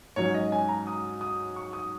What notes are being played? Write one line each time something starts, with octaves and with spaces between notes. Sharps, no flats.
G#2 F#3 C#4 C#5
D#5
G#5
A#5
D#6
D#6
C#6
D#6